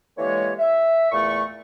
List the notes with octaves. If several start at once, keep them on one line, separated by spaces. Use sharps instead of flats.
D3 E3 G#3 A#3 G4 C#5
E5
E2 A#2 A3 C#6